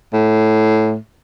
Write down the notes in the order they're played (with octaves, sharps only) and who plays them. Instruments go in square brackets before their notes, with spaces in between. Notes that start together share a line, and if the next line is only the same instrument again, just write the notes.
[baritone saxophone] A2